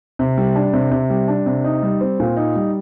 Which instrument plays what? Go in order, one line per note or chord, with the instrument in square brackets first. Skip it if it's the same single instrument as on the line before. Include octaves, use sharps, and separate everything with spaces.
[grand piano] C3
G3
D4
C3
C3
G3
D4
C3
D#4
G3
C4
A#2
D#4
G3